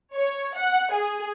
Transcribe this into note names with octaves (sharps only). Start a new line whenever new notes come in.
C#5
F#5
G#4